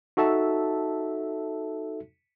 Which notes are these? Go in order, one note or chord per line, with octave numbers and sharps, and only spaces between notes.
D#4 F#4 A4 E5 A5